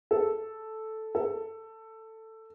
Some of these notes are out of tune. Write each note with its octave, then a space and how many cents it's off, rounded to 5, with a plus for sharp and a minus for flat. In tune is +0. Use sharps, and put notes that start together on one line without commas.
A4 -5
A4 +10